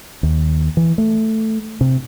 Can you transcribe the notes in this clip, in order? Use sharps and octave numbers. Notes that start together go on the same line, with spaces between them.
D#2
E3
A3
C3